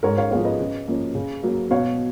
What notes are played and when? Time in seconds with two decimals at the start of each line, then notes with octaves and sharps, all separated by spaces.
0.03 G#2 A#4 C#5
0.18 C#5 F5
0.31 F3 G#3 B3 C#5 F5
0.45 B4 D#5
0.59 C#3
0.88 F3 A#3 C#4
1.15 C#3
1.43 F#3 A#3
1.71 B2 C#5 F5